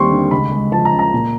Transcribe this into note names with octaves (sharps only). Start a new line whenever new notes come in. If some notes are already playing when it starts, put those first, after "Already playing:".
Already playing: D#2 G3 C4 C6 C#6
D3
C#2 B5
G#3
F3 A5
A#5
C#3
A#5
A#2